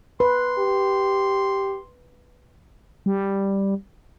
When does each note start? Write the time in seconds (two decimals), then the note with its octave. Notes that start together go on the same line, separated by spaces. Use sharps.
0.20 B4 C6
0.59 G4
3.06 G3